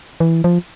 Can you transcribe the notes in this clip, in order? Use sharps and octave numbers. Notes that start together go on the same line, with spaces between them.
E3
F3